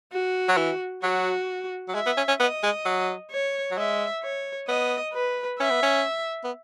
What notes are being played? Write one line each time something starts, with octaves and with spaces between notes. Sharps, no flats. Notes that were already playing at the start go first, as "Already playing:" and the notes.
F#4
F#3
E3
F#3 F#4
F#3
G#3 E5
B3
C#4
C#4
B3 D#5
G#3
F#3
C#5
F#3
G#3 E5
C#5
B3 D#5
B4
C#4 E5
B3
C#4
B3